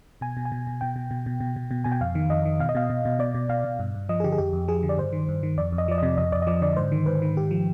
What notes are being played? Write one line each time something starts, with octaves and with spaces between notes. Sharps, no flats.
B2 G#5
B2
G#5
B2
B2
B2 G5
B2
B2
B2
B2
B2
B2
B2 G#5
G5
F2 F5
D#3
F2 D#5
D#3
B2 F5
D#5
B2 F5
B2
B2
B2 D5
B2
B2 F5
B2
G2
G2
F3 D#5
G#4
D3 G4
G#4
F2 G4
F2
F3 G#4
D3
D5
G2 C5
D#3
G2
D#3
F2 D5
F2
D#5
F3 D5
C3 D#5
F2 D#5
F2 D5
D#5
F3 D5
D3 D5
G#2 C5
D#3
G#2 B4
D#3
G#2 G4
F3